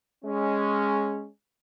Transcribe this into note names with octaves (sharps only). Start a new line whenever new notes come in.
G#3 C#4